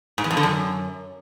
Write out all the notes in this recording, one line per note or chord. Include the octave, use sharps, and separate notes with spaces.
G#2
E2
F2
D3
F#2